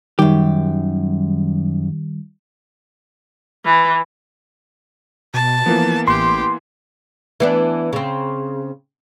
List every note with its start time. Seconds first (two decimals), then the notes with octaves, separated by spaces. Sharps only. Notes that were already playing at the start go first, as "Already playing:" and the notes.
0.19 F#2 D#3 G3 G4
3.65 E3
5.34 B2 A5
5.66 E3 F3 A#3 B3
6.07 A1 G4 C6
7.40 E3 B3 D4
7.93 C#3 C4